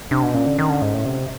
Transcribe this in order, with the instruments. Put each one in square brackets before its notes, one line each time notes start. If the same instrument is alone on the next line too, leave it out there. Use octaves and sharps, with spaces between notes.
[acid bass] C3 [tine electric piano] D4
[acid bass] B2
[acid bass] A#2 [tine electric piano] C#4
[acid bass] D3
D#3
D3
G#2
A2
C3